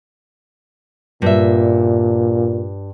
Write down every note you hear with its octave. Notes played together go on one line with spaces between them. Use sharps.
G2 A#2 E5